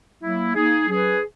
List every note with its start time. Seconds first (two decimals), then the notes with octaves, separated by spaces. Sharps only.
0.22 F#3 A#3 E4
0.54 A#3 D#4 G#4
0.87 F#3 C#4 G#4 B4